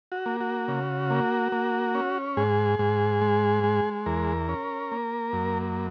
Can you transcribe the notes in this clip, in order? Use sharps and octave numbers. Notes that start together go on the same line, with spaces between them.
F#4
A#3
F#4
C#3
A#3
A#3
C#4
G#2 G#4
G#2
G#3
G#3
E2 A#4
C#4
A#3
F#2